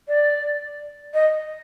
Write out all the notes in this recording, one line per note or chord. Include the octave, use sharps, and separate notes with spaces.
D5
D#5